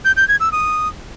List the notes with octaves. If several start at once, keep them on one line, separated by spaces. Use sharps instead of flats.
G6
G6
G#6
E6
D#6